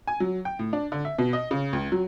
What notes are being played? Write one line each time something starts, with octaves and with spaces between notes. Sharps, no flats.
G#5
F#3
G5
A2
D4
D3
E5
B2
D#5
C#3
C#2
F#3